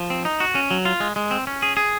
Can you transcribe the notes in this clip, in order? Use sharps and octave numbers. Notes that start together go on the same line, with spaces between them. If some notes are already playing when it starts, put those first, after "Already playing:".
Already playing: F3
C4
D#4
F#4
C#4
F#3
F4
G#3
G#3
C4
C#4
G#4
G#4